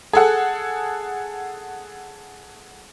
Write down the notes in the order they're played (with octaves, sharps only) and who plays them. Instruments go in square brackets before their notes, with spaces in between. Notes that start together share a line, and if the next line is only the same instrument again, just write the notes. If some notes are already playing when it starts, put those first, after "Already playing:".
[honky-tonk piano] G#4 A4 F#5